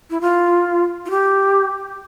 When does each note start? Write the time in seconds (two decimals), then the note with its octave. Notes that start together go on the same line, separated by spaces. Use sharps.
0.10 E4
0.21 F4
1.06 F4
1.10 G4